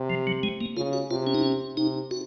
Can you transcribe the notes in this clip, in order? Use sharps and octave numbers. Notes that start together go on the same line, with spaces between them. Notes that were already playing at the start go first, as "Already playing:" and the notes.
Already playing: C3
F3
F#3
G#3
A#3
C#3 F4
F#4
C3 F4
C#4
D#4
C#4
C3 D#4
F#4